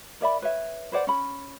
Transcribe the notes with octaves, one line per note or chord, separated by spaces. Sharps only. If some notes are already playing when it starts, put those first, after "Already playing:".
A#4 D5 E5 B5
B4 C#5 E5
B4 C5 D5 F#5
C#4 B5